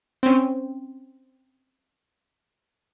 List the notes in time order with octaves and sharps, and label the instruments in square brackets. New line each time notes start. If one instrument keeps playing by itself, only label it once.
[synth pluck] C4 C#4